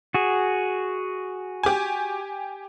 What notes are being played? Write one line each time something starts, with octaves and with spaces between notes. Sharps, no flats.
F#4 G#4
G4 G#5